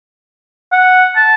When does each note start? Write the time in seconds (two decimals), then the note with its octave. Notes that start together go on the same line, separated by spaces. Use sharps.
0.72 F#5
1.16 A5